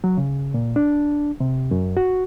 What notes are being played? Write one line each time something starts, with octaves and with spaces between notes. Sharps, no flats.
F#3
C#3
A#2
D4
C3
F#2
F#4